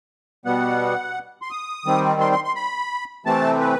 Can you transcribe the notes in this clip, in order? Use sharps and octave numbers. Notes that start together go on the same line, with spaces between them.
B2 G3 B3 F#5
C6
D#6
D#3 G3 C4
C6
C6
C6
B5
C3 E3 A3 C4 A5
B4